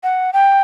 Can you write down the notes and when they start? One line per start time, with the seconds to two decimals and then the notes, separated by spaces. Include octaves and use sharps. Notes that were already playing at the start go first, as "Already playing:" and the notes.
0.03 F#5
0.33 G5